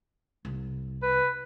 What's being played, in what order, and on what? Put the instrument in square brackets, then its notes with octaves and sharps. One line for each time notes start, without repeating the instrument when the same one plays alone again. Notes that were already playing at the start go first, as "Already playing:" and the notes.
[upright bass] C2
[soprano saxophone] B4